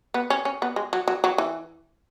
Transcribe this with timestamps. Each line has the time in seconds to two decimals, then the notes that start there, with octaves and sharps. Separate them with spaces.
0.14 B3
0.30 C#4
0.45 C#4
0.62 B3
0.76 G#3
0.93 F#3
1.08 F#3
1.24 F#3
1.38 E3